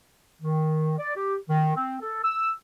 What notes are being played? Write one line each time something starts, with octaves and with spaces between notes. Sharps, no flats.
D#3
D5
G4
D#3
C4
A4
E6